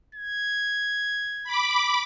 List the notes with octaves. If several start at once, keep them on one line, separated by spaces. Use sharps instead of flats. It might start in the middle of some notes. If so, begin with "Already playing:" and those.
G#6
B5 D6